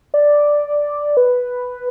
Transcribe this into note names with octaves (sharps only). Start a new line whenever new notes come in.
D5
B4